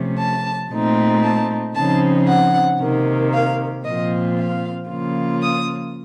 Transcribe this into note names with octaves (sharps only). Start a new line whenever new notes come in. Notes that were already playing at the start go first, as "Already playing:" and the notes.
Already playing: C3 F3 A3 C#4
A5
A#2 A3 C4 D#4
A5
C#3 F3 C4 D#4 A5
F#5
C3 D#3 A#3
F5
A#2 F3 C4 F4 D#5
F5
C#3 F3 A#3 F4
D#6